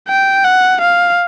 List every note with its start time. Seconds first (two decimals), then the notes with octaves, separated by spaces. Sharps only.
0.08 G5
0.44 F#5
0.81 F5